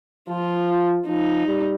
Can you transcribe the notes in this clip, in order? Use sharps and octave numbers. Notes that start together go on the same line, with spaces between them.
F3 F4
F3 D#4
G3